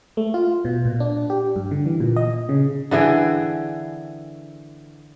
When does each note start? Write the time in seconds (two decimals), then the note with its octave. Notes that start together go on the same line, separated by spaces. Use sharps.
0.17 A3
0.34 F4
0.65 B2
0.85 A#2
1.00 D4
1.30 G4
1.56 G2
1.71 D3
1.86 E3
2.00 A#2
2.16 D#5
2.49 C#3
2.91 D3 E3 G#4 G5